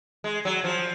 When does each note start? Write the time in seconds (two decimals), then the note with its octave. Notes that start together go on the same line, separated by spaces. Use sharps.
0.24 G#3
0.45 F#3
0.64 F3